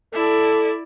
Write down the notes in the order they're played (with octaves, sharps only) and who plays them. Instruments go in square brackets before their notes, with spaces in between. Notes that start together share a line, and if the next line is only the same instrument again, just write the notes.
[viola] E4 D5 [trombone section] A4